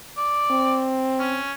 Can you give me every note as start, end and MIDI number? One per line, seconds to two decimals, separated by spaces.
0.17 0.84 74
0.51 1.40 60
1.19 1.53 61